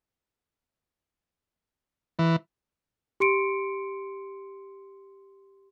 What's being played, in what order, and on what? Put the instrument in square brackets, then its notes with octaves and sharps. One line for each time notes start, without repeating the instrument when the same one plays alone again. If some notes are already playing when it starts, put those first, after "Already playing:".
[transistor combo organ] E3
[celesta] G4 C6 C#7 D7